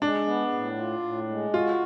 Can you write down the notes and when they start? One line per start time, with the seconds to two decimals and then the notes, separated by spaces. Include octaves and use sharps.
0.01 G#3 D4
0.26 B3
0.53 A2
0.77 F4
1.03 A2
1.29 G#3
1.54 F4 F#4